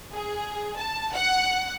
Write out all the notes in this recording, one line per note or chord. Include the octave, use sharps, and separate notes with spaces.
G#4
A5
F#5